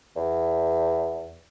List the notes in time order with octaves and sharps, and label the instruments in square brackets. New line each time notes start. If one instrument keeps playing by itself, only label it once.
[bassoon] E2